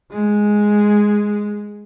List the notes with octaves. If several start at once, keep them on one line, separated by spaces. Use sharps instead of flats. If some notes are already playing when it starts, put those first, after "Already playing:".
G#3